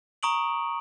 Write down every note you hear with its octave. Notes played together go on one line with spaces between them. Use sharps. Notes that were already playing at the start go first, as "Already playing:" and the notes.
A#5 C#6 D#6 D7 F#7